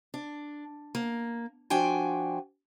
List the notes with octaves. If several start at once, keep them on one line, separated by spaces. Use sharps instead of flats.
D4
A#3
F3 D4 F#4 G5 G#5